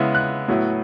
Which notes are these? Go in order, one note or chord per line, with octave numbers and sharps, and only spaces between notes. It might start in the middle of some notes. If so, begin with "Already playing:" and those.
Already playing: C#3 G#3 B3 E4
F#6
A2 F#3 B3 E4